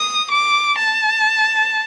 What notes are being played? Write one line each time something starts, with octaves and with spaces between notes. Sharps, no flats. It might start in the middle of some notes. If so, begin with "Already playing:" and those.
Already playing: D#6
D6
A5